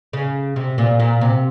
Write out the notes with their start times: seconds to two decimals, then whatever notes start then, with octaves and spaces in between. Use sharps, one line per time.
0.13 C#3
0.56 C3
0.78 A#2
1.00 A#2
1.21 C3